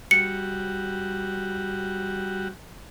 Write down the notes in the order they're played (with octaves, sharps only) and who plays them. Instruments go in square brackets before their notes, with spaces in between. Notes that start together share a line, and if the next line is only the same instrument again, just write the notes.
[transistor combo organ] G3 F#4 [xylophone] C#7